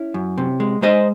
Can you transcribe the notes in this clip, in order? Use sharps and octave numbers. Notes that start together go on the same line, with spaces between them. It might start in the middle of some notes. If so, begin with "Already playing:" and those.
Already playing: C#4 E4
F#2
C3
G#3
G#3 C5 D#5